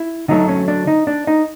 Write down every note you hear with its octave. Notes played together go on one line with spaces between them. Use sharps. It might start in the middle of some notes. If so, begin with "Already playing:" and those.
Already playing: E4
D3 F#3 A3 D#4
C#4
D4
D#4
D4
D#4